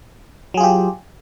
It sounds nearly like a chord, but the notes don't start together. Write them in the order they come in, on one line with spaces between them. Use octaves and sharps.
F#3 G#4 F4 G4